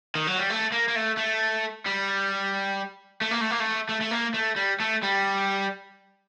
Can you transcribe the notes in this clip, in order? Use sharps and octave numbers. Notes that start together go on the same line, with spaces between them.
D#3
F#3
G3
A3
A#3
A#3
A3
A3
G3
A3
A#3
A3
A#3
A3
A3
A3
A#3
A3
G3
A3
G3